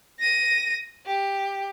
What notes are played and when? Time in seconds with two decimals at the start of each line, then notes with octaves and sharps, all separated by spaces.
0.20 A#6 D#7
1.06 G4